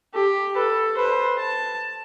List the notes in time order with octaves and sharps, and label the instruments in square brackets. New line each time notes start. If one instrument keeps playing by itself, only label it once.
[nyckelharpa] G4 [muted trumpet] A4
[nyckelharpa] A4 [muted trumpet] B4
[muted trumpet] B4 [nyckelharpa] C5
[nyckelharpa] A5